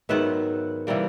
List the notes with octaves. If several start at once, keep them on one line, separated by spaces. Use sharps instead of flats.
G#2 D#3 F#3 B3 E5 F#5
C3 E3 G3 A#3